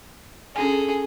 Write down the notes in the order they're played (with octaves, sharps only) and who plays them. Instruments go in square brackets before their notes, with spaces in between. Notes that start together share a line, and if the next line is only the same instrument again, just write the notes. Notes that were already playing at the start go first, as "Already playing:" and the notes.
[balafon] C#4 D4 G#5 [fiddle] G#4 A4